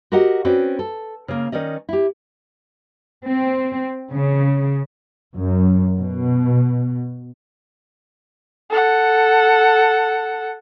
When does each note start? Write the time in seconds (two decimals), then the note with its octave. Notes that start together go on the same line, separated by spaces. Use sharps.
0.12 F#4 G4 A#4 D#5 F#5
0.45 C4 C#4 F#4 B4 D5
0.79 A4
1.28 C#3 A#3
1.52 D#3 C#4 D5 D#5
1.89 E4 G4
3.25 C4
4.12 C#3
5.35 F#2
5.99 B2
8.70 A4 F#5